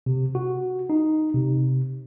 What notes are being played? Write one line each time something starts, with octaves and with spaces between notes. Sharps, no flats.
C3
F#4
D#4
C3